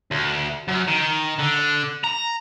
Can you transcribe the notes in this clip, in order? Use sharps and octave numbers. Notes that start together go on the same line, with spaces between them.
D2
F#2
D#3
D3
A#5